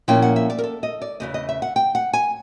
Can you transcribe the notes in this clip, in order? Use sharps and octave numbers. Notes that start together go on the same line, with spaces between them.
A#2 F3 A#3 C#4 E4 G5
F#5
E5
D5
A#4
A4
D#5
D5
E2 C#3 E3 D#5
D#5
E5
F#5
G5
F#5
G#5